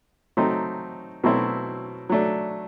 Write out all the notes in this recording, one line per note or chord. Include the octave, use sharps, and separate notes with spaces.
F#3 A3 C4 D#4
B2 F#3 A3 C4 E4
F#3 A3 D4